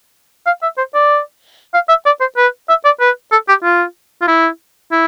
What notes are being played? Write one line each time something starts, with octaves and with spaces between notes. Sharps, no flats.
F5
E5
C5
D5
F5
E5
D5
C5
B4
E5
D5
B4
A4
G4
F4
F4
E4
E4